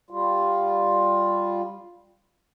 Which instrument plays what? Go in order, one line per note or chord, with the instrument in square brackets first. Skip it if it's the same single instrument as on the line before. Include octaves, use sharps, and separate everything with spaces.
[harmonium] G3 F4